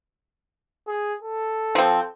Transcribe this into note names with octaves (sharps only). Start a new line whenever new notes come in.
G#4
A4
F3 C4